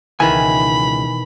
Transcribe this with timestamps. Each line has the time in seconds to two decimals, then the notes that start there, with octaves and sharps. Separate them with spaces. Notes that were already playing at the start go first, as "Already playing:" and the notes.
0.20 C#2 B2 D#3 E3 G#5 B5